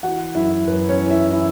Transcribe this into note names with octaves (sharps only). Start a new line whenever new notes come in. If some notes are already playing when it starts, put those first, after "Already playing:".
E3 F#4 F#5
F#2 E4 E5
F#2 B4
C#4 C#5
E3
E4 E5
E3 E4 E5